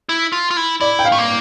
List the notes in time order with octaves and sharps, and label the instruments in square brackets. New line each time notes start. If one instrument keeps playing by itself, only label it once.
[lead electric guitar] E4
F4
F4
E4
[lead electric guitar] E4 [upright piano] D5
[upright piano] G5
F5
[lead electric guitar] A3
A#3